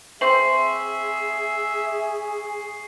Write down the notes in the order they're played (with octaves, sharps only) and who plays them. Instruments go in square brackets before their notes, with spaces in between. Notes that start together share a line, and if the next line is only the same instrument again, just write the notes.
[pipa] C4 C5 [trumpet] G#4 [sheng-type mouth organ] E5 [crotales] C#6 C7 F#7